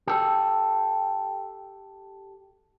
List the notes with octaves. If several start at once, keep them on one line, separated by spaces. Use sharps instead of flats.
G4 A4